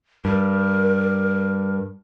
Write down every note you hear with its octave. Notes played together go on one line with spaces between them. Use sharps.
G2 A#4